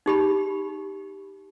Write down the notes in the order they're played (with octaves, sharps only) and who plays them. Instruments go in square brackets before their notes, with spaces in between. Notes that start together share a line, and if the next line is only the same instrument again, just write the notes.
[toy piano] D#4 G4 B5